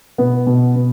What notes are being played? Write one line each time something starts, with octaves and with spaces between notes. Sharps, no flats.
B2 B3
B2
B2